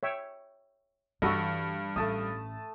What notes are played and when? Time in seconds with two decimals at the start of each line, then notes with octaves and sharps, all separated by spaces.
0.03 C#5 E5 G5
1.22 G2 E3 F#4 A4 D#5 B5
1.96 A1 A3 A5 D#6